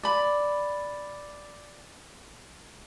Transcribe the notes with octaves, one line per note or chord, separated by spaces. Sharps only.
D5 B5